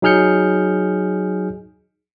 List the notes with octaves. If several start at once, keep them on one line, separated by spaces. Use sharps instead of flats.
F#3 D#4 G#4 F6 G6 C#7